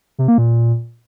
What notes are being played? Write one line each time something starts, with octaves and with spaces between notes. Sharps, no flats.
C3
A#3
A#2